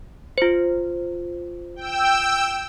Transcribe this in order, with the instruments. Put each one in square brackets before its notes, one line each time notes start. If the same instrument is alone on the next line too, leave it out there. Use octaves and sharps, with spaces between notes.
[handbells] F4 C5
[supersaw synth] G5 E6